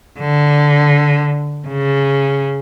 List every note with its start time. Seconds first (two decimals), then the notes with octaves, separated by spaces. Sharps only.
0.19 D3
1.68 C#3